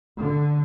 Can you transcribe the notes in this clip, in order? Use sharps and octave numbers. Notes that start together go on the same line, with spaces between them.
D3